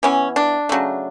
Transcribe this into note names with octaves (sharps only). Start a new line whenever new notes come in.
E3 B3 C#4
D4
C#3 F#3 A3